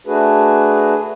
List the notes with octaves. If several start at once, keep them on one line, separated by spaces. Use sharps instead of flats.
A3 D4 F#4 G#4 B4